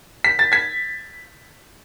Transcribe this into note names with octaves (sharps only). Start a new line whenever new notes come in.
B6
A6
G#6 B6